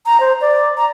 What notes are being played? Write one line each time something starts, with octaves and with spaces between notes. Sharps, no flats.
A#5
C5
D5
A#5